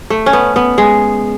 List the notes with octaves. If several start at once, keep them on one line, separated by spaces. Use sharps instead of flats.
A3
C#4
B3
B3
G#3